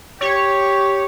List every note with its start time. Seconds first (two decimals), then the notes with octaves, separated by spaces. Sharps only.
0.21 G4 C#5